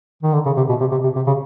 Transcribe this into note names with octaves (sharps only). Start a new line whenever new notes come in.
D#3
D3
C#3
C3
B2
C3
C3
C3
C3
C#3